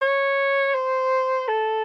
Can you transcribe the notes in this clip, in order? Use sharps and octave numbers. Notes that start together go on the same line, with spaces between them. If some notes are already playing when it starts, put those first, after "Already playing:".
C#5
C5
A4